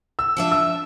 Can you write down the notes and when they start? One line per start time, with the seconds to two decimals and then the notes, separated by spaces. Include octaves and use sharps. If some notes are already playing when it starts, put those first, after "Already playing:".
0.19 E6
0.37 F3 D4 E5
0.52 E6